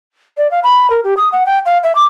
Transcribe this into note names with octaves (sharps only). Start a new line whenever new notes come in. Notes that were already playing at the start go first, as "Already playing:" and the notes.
D5
F5
B5
A#4
G4
D#6
F#5
G5
F5
E5
D6